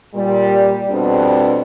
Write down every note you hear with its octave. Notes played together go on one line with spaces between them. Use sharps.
A#2 G3
F2 B2 G3 C4 D4